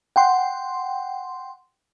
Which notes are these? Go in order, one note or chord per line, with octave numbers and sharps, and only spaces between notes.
F#5 G5 C6